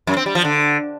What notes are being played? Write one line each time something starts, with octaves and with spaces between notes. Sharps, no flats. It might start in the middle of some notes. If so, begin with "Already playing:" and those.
F#2
C4
G3
F3
D3